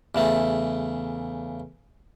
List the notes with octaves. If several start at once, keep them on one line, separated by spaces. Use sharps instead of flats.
E2 C#3 A3